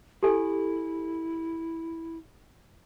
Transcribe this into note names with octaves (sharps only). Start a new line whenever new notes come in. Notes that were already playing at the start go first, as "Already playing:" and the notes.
E4 G4 A4 G#5